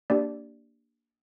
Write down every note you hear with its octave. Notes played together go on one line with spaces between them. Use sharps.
A#3 D4 G4 D5